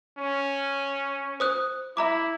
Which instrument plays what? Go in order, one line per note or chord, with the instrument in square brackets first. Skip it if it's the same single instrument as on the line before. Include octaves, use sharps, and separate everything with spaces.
[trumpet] C#4
[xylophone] C5 D#6 F#6
[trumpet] E4 [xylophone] E5 A#5 D6